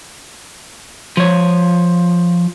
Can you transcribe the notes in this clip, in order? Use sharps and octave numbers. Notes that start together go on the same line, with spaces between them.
F3 C#5